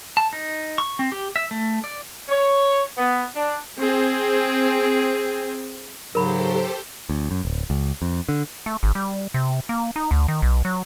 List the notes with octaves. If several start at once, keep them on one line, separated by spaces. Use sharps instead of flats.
A5
D#4
C#6
C4
G4
E5
A3
D5
C#5
B3
D4
C4 G#4
G#2 C#3 F#3 G4 A4 A#4 C5 B5
D2
F#2
D1
C#2
F2
D3
A3
G#1
G3
C3
A#3
D#4
D2
D#3
B1
F#3